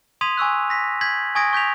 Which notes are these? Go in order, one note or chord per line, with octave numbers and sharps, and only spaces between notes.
C6 D#6 G#6 B6 D#7 F7
G#5 C#6 E6 F#6
A#6 B6
G6 G#6 B6 F#7
G#5 C#6 D#6 G#6 A#6 D7
C#6 G6 B6 F7